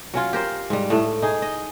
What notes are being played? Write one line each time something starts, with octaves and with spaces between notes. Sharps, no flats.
F#3 C#4 F4
G4 A#4 C5
G#2 G3
A2 A3
D#4 G#4
D#5